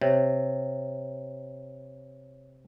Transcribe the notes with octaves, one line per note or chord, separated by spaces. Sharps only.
C3 C#5